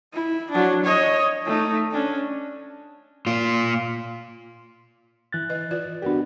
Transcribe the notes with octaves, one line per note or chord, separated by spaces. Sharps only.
E4
F#3 D4
C#5 D#5
A3 D#4
C#4 D4
A#2 F4
E3 F#6 A6
B4 D#5
F4 B4 D5
B3 D4 F#4 G4 A#4